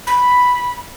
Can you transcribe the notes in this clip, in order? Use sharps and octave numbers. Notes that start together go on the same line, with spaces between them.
B5